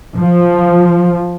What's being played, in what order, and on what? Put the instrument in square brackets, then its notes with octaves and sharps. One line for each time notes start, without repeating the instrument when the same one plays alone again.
[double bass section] F3